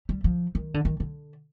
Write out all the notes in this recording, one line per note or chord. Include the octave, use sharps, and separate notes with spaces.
G3
F3
D#3
D3
D#3
D3